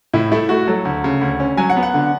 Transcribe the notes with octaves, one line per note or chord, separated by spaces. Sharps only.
A2 E4
A3 E4
A3 F#4
F#3 A4
D2
C#3
D2
C#4
F#3 G#5
F#5
B3
F#5
D3